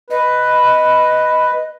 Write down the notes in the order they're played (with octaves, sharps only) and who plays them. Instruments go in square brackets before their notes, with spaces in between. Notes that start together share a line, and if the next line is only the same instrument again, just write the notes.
[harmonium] B4 [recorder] D#5